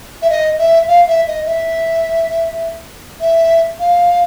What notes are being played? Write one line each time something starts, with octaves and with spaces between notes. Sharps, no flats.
E5
D#5
E5
F5
E5
D#5
E5
E5
F5